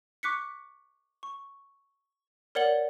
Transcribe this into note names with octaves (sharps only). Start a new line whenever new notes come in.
C#6 D6 F#6 B6 C#7
C#6
A#4 C#5 D5 F#5 F#7 G7